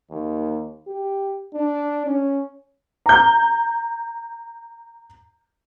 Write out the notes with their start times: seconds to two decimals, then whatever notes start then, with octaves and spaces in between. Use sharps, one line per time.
0.11 D#2
0.87 G4
1.54 D4
2.06 C#4
3.06 A#5 G6